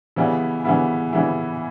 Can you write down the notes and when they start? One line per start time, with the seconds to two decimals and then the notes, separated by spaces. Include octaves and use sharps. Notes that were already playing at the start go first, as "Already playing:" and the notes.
0.16 C#3 E3 G3 B3 E4
0.65 C#3 E3 G3 B3 E4
1.13 C#3 E3 G3 B3 E4